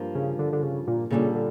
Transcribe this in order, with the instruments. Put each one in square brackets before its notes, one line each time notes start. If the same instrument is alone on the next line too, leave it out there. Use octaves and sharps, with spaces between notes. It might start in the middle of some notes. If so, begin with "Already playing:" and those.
Already playing: [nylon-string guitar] G2 F3 A#3
[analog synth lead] C#3
D3
D3
C#3
A#2
[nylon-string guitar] A#2 G3 D4 A4 D5 [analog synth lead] C#3
[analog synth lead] D3